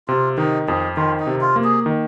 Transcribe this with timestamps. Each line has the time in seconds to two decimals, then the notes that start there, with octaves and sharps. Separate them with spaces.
0.08 C3 F4
0.38 D#3 D#4
0.68 F2 G#4
0.97 D#3 F4
1.20 D#4
1.27 C3
1.41 F4
1.56 A#3
1.64 G#4
1.86 D#3